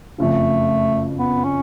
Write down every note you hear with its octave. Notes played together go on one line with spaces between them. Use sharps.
F#1 F2 C#3 F3 A3
B3
C#4